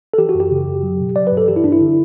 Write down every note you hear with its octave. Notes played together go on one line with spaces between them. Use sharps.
A4
E3 G4
F#4
F#2
G4
C#3
F#2
F#3
B2
F#3 D5
B4
G2
A4
E3 G4
E4
G2 D4
E4
D3